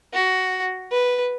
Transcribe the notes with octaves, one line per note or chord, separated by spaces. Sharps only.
F#4
B4